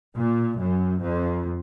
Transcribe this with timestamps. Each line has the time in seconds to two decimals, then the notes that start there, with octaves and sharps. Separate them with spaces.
0.15 A#2
0.59 F#2
1.02 F2